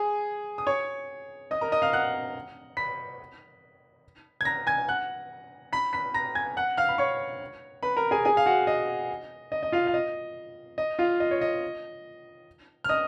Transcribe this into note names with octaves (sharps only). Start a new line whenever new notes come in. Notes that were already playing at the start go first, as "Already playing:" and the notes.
Already playing: G#4 G#5
D#6
C#5 C#6
D#5 D#6
A#4 A#5
D#5 D#6
F5 F6
F#5 F#6
B5 B6
G#6
A#5 A#6
G#5 G#6
F#5 F#6
B5 B6
B5 B6
A#5 A#6
G#5 G#6
F#5 F#6
F5 F6
B5
C#5 C#6
B4 B5
A#4 A#5
G#4 G#5
G#4 G#5
F5
F#4 F#5
D#5
D#5
D#5
F4 F5
F5
D#5
D#5
F4 F5
D#5
C#5
D#5
F6
D#5 D#6